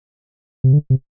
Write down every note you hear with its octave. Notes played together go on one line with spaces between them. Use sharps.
C3
D3
C3